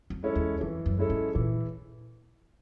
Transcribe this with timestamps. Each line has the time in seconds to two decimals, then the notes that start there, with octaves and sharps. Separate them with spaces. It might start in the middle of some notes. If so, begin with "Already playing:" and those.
0.10 F2
0.23 G#3 C#4 E4 A4
0.35 E2
0.61 F2 E3
0.86 F#2
0.98 G#3 C#4 E4 A4
1.10 G#2
1.35 A#2 E3